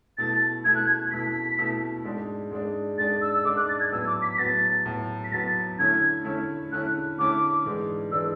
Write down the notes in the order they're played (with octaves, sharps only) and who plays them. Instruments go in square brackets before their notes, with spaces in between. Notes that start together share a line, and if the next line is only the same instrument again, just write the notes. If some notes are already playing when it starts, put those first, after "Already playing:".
[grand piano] B2 A3 E4 [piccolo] A6
[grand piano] B2 A3 E4 [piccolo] G#6
[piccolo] F#6
G#6
[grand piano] B2 A3 E4 [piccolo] B6
[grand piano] B2 A3 E4
G#2 G#3 D4
G#2 G#3 D4
[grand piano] G#2 G#3 D4 [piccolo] A6
[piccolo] E6
E6
[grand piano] G#2 G#3 D4 [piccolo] D6
[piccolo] F#6
A6
G#6
[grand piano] A2 F#3 B3 [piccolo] E6
[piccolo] D6
B6
B6
[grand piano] A2 F#3 B3 [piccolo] A6
[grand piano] A2 F#3 B3
[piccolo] B6
[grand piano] A2 F#3 B3 [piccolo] A6
[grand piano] D3 A3 C#4 E4 [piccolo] G#6
[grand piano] D3 A3 C#4 E4
[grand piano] D3 A3 C#4 E4 [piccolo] F#6
[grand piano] D3 A3 C#4 E4 [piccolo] D6
[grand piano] G#2 E3 G#3 D4
[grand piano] E3 G#3 D4 [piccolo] E6